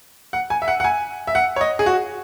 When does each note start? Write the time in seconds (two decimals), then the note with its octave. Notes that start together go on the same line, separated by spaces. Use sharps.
0.33 F#5
0.50 G#5
0.62 E5
0.68 F#5
0.80 F#5
0.84 G#5
1.27 E5
1.35 F#5
1.56 C#5
1.61 D#5
1.79 G#4
1.86 F#4